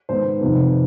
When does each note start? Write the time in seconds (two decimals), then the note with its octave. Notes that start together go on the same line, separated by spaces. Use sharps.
0.09 G#2 D#3 B3 C5
0.41 F2 C3 D#3 B3